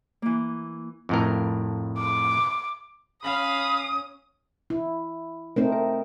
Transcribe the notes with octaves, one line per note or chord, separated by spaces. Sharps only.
E3 A#3
F2 A2 A#4
D6
C#4 F5 B5 D#6
E4
A3 C4 D#4 A#4 C5
A#4